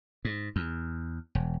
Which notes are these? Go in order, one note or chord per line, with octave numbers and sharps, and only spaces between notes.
G#2
E2
E1